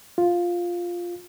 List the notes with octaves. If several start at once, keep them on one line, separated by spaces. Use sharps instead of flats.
F4